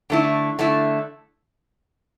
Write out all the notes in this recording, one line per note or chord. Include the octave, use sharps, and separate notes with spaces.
D3 A3 E4
D3 A3 E4